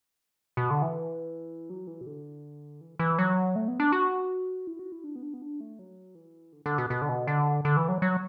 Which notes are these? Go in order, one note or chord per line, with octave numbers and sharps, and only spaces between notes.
B2
D3
E3
F#3
E3
B2
D3
E3
E3
F#3
A3
B3
D4
F#4
E4
F#4
E4
D4
B3
D4
B3
D4
A3
F#3
E3
D3
D3
B2
B2
D3
B2
D3
D3
E3
F#3
F#3